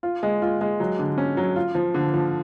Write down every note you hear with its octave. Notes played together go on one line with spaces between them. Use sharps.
F4
G#3
F4
G#3
F#3
D3
C#4
F#3
F4
F3
D3
F3